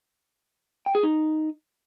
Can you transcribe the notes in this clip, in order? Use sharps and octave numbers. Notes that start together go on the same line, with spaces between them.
G5
G#4
D#4